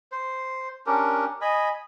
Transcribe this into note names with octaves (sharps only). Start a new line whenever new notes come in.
C5
C#4 D4 G4 A#4
D#5 G#5 B5